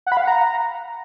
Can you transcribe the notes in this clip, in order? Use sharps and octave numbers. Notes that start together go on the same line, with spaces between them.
F#5
B5
F5
F#5
A#5